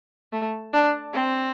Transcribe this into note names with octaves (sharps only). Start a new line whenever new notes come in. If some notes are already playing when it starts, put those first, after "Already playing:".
A3
D4
C4